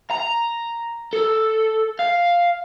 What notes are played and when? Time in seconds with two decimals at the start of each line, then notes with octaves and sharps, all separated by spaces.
0.10 A#5
1.13 A4
1.99 F5